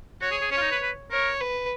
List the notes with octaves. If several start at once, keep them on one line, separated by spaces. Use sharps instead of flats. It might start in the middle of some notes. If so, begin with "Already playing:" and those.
F#4 C#5
G#4
G#4
C#4 C#5
F4
D#4
B4
B4
A#4 C#5
B4